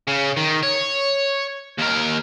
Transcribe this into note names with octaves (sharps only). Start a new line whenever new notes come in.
C#3
D#3
C#5
D#2 A#4